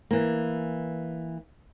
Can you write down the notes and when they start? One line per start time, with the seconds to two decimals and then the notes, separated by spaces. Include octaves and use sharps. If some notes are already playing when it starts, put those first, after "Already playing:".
0.11 E3 A#3